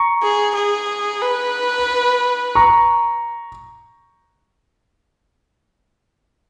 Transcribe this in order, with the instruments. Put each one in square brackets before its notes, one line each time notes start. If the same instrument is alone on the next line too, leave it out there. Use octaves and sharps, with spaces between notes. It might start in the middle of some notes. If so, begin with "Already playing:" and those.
Already playing: [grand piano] A#5 C#6
[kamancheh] G#4
G#4
B4
[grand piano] A#5 C#6